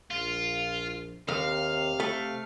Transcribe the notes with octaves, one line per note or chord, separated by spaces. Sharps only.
A#1 F4
D#2 C3 F5
A3